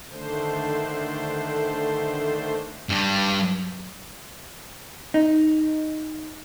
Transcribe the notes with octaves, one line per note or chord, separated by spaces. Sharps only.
D3 D#3 A3 D4 C5
G2 G3
D#4